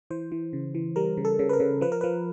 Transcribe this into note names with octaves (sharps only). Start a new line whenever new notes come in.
E3 C5
E3
C#3
E3
G3 A#4
C#3
A4
C#3
B4
A#4
C#3
F3 B4
A#4
F3 B4